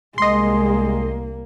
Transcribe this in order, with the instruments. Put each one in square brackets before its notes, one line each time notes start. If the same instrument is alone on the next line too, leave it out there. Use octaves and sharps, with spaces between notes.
[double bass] C2 A#3 [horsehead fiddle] G#3 [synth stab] D#5 C6